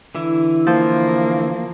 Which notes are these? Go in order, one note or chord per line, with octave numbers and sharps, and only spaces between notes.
D3 E3 E4
F3 A#3